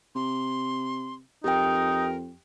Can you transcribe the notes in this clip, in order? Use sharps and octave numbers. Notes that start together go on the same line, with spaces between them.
C3 C6
F2 D#4 G4 A#4 G5